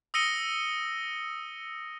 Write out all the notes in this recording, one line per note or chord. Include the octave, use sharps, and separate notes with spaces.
D#6 E6 A#6 C#7 D#7 G7